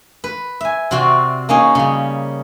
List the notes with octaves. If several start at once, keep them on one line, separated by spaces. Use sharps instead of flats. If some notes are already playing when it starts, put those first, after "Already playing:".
B4
E5 G#5
C3 C4 F#4 D5 G5
A#3 C#4 D#4 G#4
C#3 G3